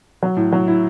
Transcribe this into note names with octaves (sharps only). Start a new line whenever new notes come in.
F#3
A2
F#3
E4